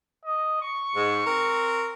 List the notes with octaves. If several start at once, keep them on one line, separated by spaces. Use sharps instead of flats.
D#5
C#6
G#2
C4 A#4